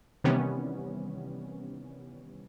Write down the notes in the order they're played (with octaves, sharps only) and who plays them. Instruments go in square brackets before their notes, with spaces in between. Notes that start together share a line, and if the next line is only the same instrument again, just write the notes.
[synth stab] C3 D#3 E3 G3 B3 C#4